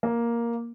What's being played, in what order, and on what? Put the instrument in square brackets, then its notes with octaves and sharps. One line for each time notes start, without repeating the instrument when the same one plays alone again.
[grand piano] A#3